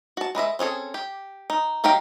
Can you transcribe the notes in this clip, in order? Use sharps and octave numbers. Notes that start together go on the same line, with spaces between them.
F#4 A5
G#3 B4 D#5 E5
C4 C#4 G#4 A4
G4
D#4
F#3 D#4 G4 F5 G5